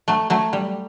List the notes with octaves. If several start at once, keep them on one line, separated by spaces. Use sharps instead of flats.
F#3 A3
F#3 A3
G3